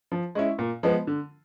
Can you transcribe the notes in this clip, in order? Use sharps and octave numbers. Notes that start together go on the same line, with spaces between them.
F3
G#3 C#4 E4
A#2
F3 G#3 B3
D3